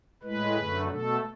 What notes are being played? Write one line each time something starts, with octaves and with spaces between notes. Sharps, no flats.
A2 G#3 B4
F#2 D3 A3
B2 A3 A4